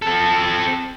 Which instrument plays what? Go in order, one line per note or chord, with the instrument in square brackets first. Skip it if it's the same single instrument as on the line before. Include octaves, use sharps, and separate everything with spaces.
[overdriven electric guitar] C4 A4